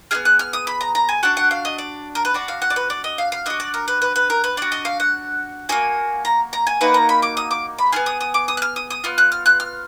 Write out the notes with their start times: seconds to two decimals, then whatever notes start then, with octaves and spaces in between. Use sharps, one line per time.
0.11 B3 D#4 G#4 F6
0.25 F#6
0.39 F6
0.53 D#6
0.67 B5
0.81 A#5
0.95 A#5
1.09 G#5
1.23 D4 F#4 F#5
1.37 F#5
1.51 F5
1.65 D#5
1.78 D5
2.15 A#4
2.25 B4
2.34 D4 F#4 D5
2.48 F5
2.62 F#5
2.70 D5
2.76 B4
2.90 D5
3.04 D#5
3.18 F5
3.32 F5
3.46 D4 F#4 D#5
3.60 D5
3.74 A#4
3.88 B4
4.02 B4
4.16 B4
4.30 A#4
4.44 B4
4.57 D4 F#4 D5
4.72 D#5
4.85 F5
5.00 F#5
5.69 A#3 D#4 F#4 G#5
6.25 A#5
6.53 A#5
6.67 G#5
6.81 A#3 D#4 F#4 B4
6.94 A#5
7.09 B5
7.22 D6
7.37 D#6
7.51 D6
7.78 B5
7.92 B3 F4 G#4 F6
8.06 D#6
8.21 D#6
8.34 D6
8.48 D#6
8.57 F#6
8.62 F6
8.76 D#6
8.90 D#6
9.04 B3 F4 F6
9.18 F#6
9.32 F6
9.46 F#6
9.60 F6